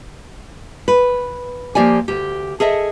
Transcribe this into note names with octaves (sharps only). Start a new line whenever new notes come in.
B4
F3 A#3 G4 D5 G#5
D2 G4
G#4 A4 D#5 E5